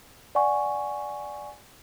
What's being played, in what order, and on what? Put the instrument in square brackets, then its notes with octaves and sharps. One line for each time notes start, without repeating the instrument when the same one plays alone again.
[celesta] D5 F#5 G#5 C#6